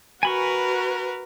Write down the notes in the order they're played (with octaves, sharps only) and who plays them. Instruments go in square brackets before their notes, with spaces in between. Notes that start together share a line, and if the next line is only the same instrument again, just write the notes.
[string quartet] F#4 A#4 B4 [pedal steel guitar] G#5 B5 C#6